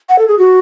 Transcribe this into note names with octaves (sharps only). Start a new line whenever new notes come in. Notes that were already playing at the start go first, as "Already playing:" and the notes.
F#5
A4
G#4
F#4